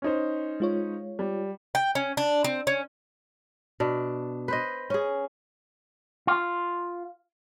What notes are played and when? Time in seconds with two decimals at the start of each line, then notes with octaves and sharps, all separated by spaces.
0.02 C#4 D#4 C5
0.60 G#3 F4 C#5
1.19 G3
1.75 G5
1.95 C#4
2.17 D4
2.44 C4
2.67 C#4
3.80 B2 D4
4.48 B4 C5 D#5
4.90 C#4 G#4
6.27 F4